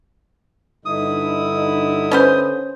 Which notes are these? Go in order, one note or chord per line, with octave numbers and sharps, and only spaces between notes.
G2 D3 D#4 E4 D#6
C#4 B4 C5